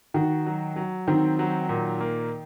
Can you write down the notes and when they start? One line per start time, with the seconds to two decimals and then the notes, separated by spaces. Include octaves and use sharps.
0.14 D#3 F#4
0.46 F#3
0.76 F#3
1.08 D#3 C4
1.39 F#3
1.69 A#2
2.01 A#3